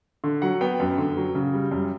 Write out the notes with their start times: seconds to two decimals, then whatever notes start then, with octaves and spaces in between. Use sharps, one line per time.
0.24 D3
0.42 F#3 F#5
0.61 B3 G5
0.80 F#2
0.98 D3
1.17 F#3
1.35 C#3
1.54 G3
1.71 F#2